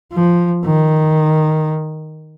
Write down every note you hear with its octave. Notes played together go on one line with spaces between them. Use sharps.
F3
D#3